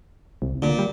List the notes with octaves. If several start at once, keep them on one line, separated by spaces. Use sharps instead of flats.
C2
A#2 D3
G3